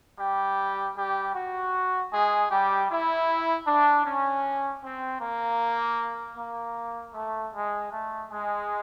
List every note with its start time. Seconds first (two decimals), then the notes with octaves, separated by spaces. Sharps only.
0.20 G3 G4
0.96 G3 G4
1.35 F#4
2.12 G#3 G#4
2.51 G3 G4
2.91 E4
3.67 D4
4.06 C#4
4.82 C4
5.21 A#3
6.37 A#3
7.14 A3
7.54 G#3
7.92 A3
8.30 G#3